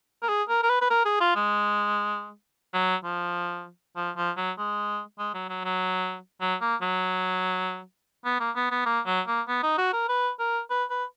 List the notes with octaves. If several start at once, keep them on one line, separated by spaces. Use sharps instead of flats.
A#4
G#4
A#4
A#4
B4
B4
A#4
G#4
F4
G#3
F#3
F3
F3
F3
F#3
G#3
G#3
F#3
F#3
F#3
F#3
A#3
F#3
B3
A#3
B3
B3
A#3
F#3
A#3
B3
D#4
F#4
A#4
B4
A#4
B4
B4